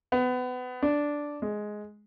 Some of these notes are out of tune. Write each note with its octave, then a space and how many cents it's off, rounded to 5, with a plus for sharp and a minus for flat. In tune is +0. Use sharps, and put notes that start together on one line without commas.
B3 +25
D4 -5
G#3 +10